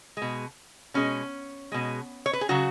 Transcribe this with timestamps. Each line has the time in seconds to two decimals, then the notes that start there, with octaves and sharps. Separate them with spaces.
0.17 B2 G#3
0.94 B2 G#3 C#4
1.72 B2 G#3
2.26 C#5
2.33 B4
2.41 G#4
2.49 C#3 F#3 F#4